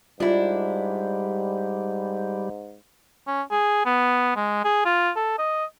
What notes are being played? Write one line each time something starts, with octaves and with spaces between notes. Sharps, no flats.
G#2 G3 D4 E4 F4
C#4
G#4
B3
G#3
G#4
F4
A4
D#5